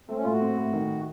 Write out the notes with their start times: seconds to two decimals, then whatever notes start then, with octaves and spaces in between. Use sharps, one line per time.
0.08 A3 C4
0.17 C#4
0.24 A2 F4
0.32 F#4
0.41 C4
0.57 A2
0.73 D#3